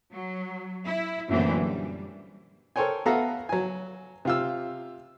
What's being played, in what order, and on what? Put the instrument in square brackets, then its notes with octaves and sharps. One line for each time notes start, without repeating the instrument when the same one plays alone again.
[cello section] F#3
E4
F#2 A#2 D3 E3 A3 C4
G3
[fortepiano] A4 A#4 C5 C#5 G5 G#5
B3 F#4 A4 E5 F5 A#5
F#3 G#5
C3 F4 E6